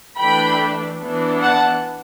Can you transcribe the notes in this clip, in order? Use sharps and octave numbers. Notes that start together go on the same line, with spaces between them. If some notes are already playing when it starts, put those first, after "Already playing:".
E3 A3 D4 G5 B5
E3 B3 D4
F#5 A5